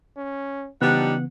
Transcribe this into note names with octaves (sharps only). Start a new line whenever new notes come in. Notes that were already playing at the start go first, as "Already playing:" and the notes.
C#4
C#3 E3 F3 G3 B3 D4 D#4 F#5